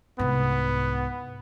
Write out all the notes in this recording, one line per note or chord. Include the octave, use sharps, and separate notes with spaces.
C2 G#2 B3